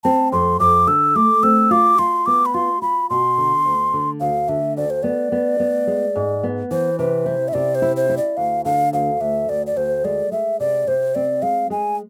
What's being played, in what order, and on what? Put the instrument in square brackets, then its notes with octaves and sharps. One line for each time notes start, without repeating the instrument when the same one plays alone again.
[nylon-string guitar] C4 [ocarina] A5
[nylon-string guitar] F2 [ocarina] C6
[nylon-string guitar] F2 [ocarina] D6
[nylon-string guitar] D3 [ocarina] E6
[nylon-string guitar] A3 [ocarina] D6
[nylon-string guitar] C4 [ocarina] E6
[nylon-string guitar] F4 [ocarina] D6
[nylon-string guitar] F4 [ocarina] C6
[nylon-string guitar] B3 [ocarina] D6
[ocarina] B5
[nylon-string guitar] F4 [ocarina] C6
[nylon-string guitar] F4 [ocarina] B5
[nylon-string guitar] B2 [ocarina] C6
[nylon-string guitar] D3
D2
D3
[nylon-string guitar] D2 [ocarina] F5
[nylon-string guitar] D3 [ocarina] E5
[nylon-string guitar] D2 [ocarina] D5
[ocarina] C5
[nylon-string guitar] B3 [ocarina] D5
[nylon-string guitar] B3
B3
G#3
G#2
B3
[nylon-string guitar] E3 [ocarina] C5
[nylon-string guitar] C3 [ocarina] B4
[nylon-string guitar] E4 [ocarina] C5
[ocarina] E5
[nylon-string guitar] C3 [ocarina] D5
[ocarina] C5
[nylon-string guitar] E4
[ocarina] C5
[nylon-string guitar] E4
[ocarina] D5
[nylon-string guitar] D2 [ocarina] F5
[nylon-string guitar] D3 [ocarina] F5
[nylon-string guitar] D2 [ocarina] F5
[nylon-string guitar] D2 [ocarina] E5
[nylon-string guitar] D2 [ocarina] D5
[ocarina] D5
[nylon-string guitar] D2 [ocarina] C5
[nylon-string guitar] G#3 [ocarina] D5
[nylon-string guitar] G#3 [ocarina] E5
[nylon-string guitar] C3 [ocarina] D5
[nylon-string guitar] C3 [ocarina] C5
[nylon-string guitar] C4 [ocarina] D5
[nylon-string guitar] G#3 [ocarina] F5
[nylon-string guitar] G#3 [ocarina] G#5